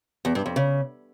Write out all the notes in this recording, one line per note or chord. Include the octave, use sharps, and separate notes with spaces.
E2
G2
F2
C#3